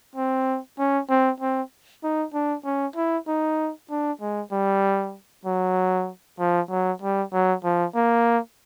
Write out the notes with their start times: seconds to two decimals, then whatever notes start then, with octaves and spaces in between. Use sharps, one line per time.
0.16 C4
0.79 C#4
1.10 C4
1.41 C4
2.04 D#4
2.34 D4
2.65 C#4
2.96 E4
3.28 D#4
3.90 D4
4.21 G#3
4.52 G3
5.46 F#3
6.39 F3
6.70 F#3
7.02 G3
7.33 F#3
7.64 F3
7.95 A#3